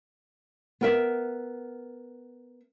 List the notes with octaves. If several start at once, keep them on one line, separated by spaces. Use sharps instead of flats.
B3 A#4 E5